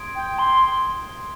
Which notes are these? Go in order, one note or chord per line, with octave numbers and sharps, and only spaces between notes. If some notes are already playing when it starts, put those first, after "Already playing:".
Already playing: C6 D#6 G#6 D7
G5
C6